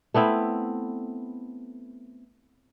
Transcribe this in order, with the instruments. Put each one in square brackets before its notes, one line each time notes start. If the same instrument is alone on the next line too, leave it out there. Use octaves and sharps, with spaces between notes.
[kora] A3 B3 C4 E4